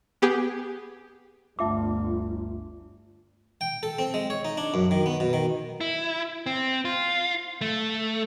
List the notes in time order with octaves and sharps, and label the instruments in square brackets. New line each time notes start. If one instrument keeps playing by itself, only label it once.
[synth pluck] B3 G4 G#4
[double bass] G1 [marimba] D2 A3 A5 [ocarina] F4 [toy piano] E5 D6
[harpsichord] G5
A4
C4
G#3
C#5
D#4
D4
F#2
D#3
B3
B2
D#3
[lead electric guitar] E4
C4
F4
A3